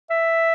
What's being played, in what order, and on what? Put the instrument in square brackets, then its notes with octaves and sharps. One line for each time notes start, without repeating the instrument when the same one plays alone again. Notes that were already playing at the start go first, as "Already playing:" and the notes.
[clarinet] E5